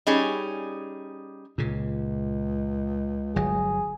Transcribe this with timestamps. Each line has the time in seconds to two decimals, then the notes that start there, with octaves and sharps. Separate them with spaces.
0.07 G3 C#4 D#4 G#4
1.58 C#2 A#2 C#3
3.36 G1 F#3 G#4